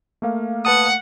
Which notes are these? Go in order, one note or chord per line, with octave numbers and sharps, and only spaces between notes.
A3 A#3 F5
B4 F#5 A5 D#6